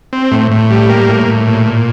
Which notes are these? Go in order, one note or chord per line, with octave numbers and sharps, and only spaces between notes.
C4
A2
A2
G3
A#3
A2
A2
A#2
A#2